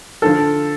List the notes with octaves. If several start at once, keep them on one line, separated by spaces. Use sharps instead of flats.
D3 F3 A4